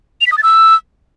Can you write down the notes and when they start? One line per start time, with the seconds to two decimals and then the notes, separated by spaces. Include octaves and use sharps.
0.21 F7
0.26 B6
0.32 D#6
0.37 A6
0.43 E6